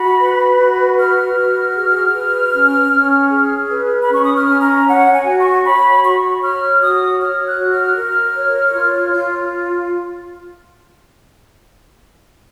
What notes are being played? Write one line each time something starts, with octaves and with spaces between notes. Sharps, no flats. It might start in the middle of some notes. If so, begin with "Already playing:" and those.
Already playing: F#4 B5
B4
F#4
B4 F6
F#4
G#4
B4
C#4
C#4
G#4
B4
B5
C#4 C#6
D#6
F6
C#4
A#5
C#5 F#5
G#5
F#4
C#6
C#5 B5
F#4 C#6
C#5 F6
F#4 D#6
C#5 F6
F#6
F#4
F6
A#4
C#5
F4
F4